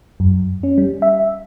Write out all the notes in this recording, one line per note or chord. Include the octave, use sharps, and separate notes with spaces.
F#2
C#4
G3
E5